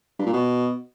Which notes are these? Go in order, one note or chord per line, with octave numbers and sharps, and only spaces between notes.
G2
A#2
B2